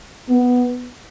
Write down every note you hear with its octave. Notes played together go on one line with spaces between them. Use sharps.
B3